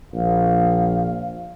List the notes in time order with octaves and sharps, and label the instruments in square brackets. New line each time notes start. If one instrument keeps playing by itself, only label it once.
[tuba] A#1 [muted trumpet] F5